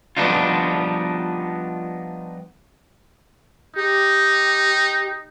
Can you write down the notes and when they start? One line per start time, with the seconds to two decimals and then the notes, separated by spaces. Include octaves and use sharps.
0.17 F3 G3 B3 D4 D#4 F4
3.76 D#4 G4